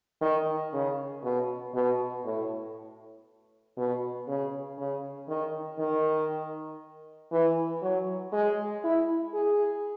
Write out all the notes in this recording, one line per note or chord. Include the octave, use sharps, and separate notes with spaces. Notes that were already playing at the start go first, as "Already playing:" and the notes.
D#3
C#3
B2
B2
A2
B2
C#3
C#3
D#3
D#3
E3
F#3
G#3
E4
G#4